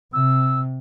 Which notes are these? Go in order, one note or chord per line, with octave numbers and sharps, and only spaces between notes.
C3 E6